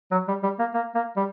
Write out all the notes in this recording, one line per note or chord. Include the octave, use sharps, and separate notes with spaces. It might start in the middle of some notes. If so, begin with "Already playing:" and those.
F#3
G3
G3
A#3
A#3
A#3
G3